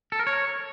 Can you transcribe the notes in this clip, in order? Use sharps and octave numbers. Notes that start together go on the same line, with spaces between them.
A4
A#4
C#5